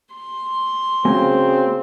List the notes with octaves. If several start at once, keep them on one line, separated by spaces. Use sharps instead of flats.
C6
C#3 A#3 C4 F#4 G#5